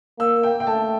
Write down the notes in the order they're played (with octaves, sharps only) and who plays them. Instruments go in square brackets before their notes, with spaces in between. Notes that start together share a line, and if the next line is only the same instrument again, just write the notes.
[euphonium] A#3 [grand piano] E6
[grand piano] G5
G5
[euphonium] A3 [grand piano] A5